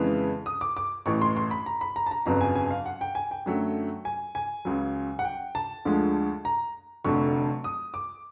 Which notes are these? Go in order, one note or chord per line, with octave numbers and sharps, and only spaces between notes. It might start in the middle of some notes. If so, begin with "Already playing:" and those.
Already playing: F2 C#3 E3 G#3 B3
D#6
D6
D6
A1 A2 E3 C#6
C6
C6
B5
A#5
B5
A#5
A5
A#5
G1 F2 C#3 F#3 B3 A#5
G#5
G#5
F5
F#5
G5
G#5
G5
F#2 D3 F#3 A3
G#5
G#5
C#2 C#3 F#3
F#5
G5
A5
D2 D3 F3 G#3
A#5
F1 F2 D3 F#3 A3 C#6
D#6
D6